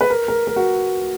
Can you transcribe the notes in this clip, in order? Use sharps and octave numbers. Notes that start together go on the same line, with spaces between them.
B4
A#4
A#4
A#4
F#4